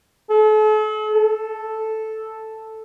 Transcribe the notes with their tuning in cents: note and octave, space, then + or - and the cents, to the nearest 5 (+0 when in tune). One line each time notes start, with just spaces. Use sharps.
A4 -45
A4 +0